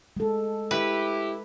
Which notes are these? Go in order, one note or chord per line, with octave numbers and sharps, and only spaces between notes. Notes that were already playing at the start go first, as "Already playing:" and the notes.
G#3 A4
E4 G4 B4